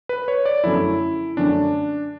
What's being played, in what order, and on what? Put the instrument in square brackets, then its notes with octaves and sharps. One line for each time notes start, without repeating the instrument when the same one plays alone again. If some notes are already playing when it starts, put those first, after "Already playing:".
[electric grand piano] B4
C#5
D5
[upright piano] F#2 D3 F#3 A3 C#4 [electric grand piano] E4
[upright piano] F#2 D3 F#3 A3 C#4 [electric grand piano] D4